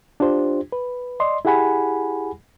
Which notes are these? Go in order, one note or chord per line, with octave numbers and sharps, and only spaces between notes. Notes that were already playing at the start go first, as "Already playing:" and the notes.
D4 F4 G4 C5
B4
D5 D#5 C6
E4 G4 G#4 F#5 G#5 B5